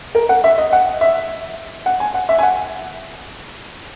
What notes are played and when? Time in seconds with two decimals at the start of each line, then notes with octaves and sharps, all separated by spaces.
0.15 A#4
0.29 F#5
0.44 E5
0.58 D#5
0.73 F#5
1.01 E5
1.86 F#5
2.00 G#5
2.14 F#5
2.29 E5
2.38 G#5
2.43 F#5